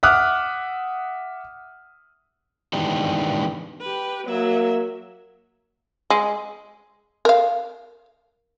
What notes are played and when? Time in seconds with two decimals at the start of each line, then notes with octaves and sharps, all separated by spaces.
0.03 E5 F#5 D6 D#6 F6 F#6
2.73 D#3 E3 G#3 B3 D4 G4
3.81 G4 B4
4.28 F#3 A#3 E5
6.10 G#3
7.25 A#4 F5